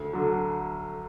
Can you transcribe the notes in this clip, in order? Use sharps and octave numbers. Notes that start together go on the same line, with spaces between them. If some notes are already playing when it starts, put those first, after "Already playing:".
Already playing: D2
D3 F#3